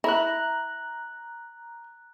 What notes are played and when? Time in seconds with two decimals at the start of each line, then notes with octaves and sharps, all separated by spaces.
0.04 E4 A#5 F#6